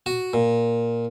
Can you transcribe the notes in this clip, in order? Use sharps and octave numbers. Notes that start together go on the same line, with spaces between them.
F#4
A#2